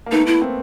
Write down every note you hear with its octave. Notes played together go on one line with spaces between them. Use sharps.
A#3
A3 B3 D#4
E4
A#3 C4